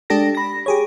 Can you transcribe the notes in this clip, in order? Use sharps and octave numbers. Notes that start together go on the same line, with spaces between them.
G#3 D4 G4 A4 A#6
B5 A#6
G4 G#4 C#5